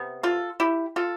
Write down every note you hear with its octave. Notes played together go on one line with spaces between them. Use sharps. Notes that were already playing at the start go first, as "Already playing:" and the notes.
Already playing: C3 B3
F4 A4
E4 G4
F4 A4